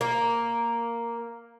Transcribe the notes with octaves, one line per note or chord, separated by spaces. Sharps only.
A#3